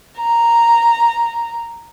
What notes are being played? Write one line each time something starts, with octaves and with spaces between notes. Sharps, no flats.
A#5